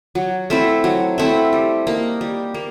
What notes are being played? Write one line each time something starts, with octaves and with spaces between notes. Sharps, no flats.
F#3
A3 C4 E4
F#3
A3 C4 E4
G3
A#3 D#4
G3
A#3